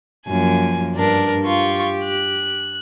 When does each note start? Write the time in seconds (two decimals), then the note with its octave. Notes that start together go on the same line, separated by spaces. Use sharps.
0.27 F#2 F3 A#3 G#5
0.96 G2 D4 A#4
1.45 F4 G4 C#6
2.05 F#6